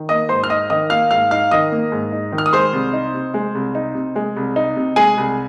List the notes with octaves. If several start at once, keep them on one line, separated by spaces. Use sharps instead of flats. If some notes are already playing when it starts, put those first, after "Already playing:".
Already playing: D#3
A#3 D#5 D#6
G#2 C5 C6
F6
D#4 D#5 D#6
D#3 D#5 D#6
A#3 F5 F6
G#2 F5 F6
D#4 F5 F6
D#3 D#5 D#6
A#3
G#2
D#4
D#3
F6
D#6
G#3 C5 C6
C2
D#4
C3
G#3
C2
D#4
C3
G#3
C2
D#4
C3
G#3 G#4 G#5
C2